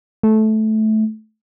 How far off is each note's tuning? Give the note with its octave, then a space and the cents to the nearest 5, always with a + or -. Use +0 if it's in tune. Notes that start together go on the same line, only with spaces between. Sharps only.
A3 -15